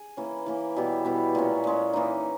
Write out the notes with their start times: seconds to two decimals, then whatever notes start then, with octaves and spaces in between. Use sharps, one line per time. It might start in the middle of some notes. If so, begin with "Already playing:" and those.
Already playing: G#4
0.17 E3 A#3 C#4
0.46 E3 A#3 C#4
0.76 B2 G3 B3 E4
1.05 B2 G3 B3 E4
1.35 A#2 G#3 C#4
1.64 A#2 G#3 C#4
1.93 E3 A#3 D#4